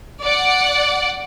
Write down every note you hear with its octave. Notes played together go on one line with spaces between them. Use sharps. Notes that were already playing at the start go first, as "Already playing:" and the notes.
D5 F#5